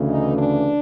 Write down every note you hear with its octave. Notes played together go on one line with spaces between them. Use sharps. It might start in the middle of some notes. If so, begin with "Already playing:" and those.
Already playing: D2 C#3 E3
D#4
D4